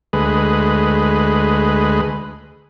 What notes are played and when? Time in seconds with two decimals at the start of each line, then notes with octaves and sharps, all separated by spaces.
0.13 D2 G#3 B4